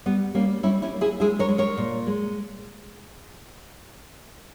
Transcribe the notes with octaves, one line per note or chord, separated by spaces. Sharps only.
G3 B3
G3 A#3 C#4
G3 C#4 E4
C#4 E4
A#3
E4 G#4
G#3 E4 G#4
A#4 C#5
G#3
A#4 C#5
A#2
G#3